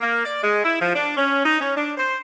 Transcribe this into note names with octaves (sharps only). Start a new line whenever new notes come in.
A#3
D5
G#3
E4
F3
D4
C#4
D#4
C#4
D4
C5